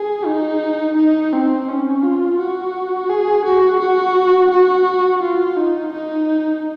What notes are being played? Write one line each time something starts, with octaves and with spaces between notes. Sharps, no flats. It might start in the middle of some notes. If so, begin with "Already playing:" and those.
Already playing: G#4
D#4
D#4
C4
C#4
F4
F#4
G#4
F#4
F#4
F#4
F4
D#4
D#4